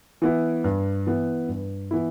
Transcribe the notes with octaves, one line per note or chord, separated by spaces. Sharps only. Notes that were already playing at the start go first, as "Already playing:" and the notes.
E3 B3 E4
G2
E3 B3 E4
G2
E3 B3 E4